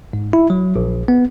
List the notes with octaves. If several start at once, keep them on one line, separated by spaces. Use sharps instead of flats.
G#2
E4
F#3
A#1
B3